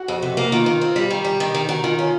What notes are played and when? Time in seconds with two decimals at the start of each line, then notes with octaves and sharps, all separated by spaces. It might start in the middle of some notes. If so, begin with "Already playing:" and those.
Already playing: F#4
0.08 F2
0.22 C3
0.37 A#3
0.52 D#3 F4
0.66 D#3
0.81 C4
0.96 G3
1.10 D#3 G4
1.25 G3
1.40 D#3
1.55 D#3
1.69 D#3 F#4
1.84 D#3 F4
1.98 C#4 F4